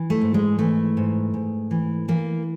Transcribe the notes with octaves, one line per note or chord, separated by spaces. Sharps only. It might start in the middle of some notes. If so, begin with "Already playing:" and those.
Already playing: E3
A3
G#2
G#3
E3 A3
G#2
G#2
E3
E3 A#3